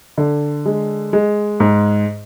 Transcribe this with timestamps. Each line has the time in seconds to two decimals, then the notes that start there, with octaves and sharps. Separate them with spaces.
0.18 D3
0.66 G#3
1.13 G#3
1.60 G#2